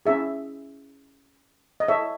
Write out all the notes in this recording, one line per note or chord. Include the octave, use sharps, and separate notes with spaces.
C#4 E4 G#4 E5
D#5
E4 A4 C#5 E5